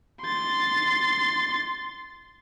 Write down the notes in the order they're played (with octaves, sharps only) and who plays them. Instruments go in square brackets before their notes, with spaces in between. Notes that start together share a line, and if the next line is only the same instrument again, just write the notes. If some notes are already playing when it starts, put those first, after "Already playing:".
[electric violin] C6 A6